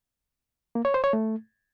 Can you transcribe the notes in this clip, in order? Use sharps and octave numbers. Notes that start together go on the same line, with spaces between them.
A#3
C#5
C5
C#5
A3